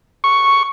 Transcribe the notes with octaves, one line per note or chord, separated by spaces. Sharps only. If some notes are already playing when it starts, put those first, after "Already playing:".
C#6